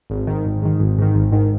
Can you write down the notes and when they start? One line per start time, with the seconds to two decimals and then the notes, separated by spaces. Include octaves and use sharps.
0.10 G#1
0.27 G#2 D#3
0.45 G#1
0.62 G#2 D#3
0.80 G#1
0.98 G#2 D#3
1.14 G#1
1.32 G#2 D#3